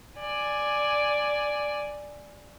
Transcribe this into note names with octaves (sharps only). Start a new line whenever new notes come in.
D5 G#5